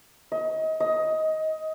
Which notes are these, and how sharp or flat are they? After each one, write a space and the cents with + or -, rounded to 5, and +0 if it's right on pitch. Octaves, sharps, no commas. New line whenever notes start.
D#5 +30
D#5 +15